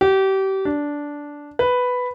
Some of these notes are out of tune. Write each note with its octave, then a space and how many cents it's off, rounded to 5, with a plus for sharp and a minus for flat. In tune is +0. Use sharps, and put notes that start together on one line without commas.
G4 -30
D4 -10
B4 +5